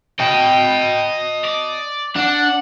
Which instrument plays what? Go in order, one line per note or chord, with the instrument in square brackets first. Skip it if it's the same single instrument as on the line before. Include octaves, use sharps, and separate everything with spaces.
[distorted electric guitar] D#5 A5 [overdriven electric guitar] G5
[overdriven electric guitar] D5
[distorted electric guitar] D4 [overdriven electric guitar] F#5